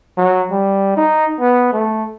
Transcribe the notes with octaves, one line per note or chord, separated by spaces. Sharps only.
F#3
G3
D#4
B3
A3